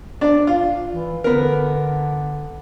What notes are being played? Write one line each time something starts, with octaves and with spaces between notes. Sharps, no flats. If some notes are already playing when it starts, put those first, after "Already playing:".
D4 D5
F4
E3
D3 B3 A#4